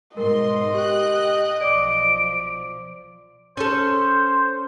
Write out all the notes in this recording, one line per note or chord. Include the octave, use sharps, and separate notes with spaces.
G#2 B2 A#4 D#5 C6
G4 G5 F#6
B1 F3 D5 D6 D7
C#4 A4 C5